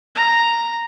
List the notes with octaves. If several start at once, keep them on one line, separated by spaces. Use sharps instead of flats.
A#5